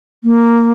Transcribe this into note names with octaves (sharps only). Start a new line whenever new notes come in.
A#3